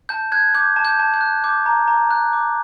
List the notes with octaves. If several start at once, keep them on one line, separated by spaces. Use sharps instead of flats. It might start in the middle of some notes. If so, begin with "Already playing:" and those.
A5 G6
F#6 G#6
D6 G6
A5
G6
A5
G6
F#6
D6 G6
A#5
A#5
F#6
D6